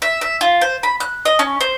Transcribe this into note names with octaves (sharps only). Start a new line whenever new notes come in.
E5
E5
F4
C5
B5
F#6
D#5
C#4
C5